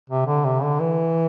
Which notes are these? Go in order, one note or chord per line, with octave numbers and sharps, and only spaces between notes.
C3
D3
C3
D3
E3